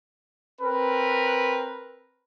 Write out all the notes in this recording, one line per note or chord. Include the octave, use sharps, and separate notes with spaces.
C4 A#4 B4